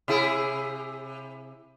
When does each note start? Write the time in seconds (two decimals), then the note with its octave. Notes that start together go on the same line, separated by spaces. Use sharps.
0.08 C3 E4 G#4